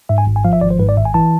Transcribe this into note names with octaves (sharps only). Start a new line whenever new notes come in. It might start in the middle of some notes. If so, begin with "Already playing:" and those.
G#2 E5
G#5
G#1
G#5
F3 F5
E5
G#1 D5
C5
G#2 B4
D5
G#1 E5
G#5
E3 A5